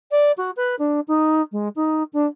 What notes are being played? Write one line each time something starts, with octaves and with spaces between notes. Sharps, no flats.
D5
F#4
B4
D4
D#4
G#3
D#4
D4